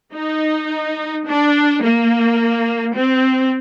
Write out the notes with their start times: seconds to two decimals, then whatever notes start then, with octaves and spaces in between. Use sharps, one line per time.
0.13 D#4
1.25 D4
1.82 A#3
2.95 C4